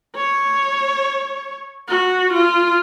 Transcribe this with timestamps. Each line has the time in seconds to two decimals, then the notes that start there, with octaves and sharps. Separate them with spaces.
0.16 C#5
1.88 F#4
2.33 F4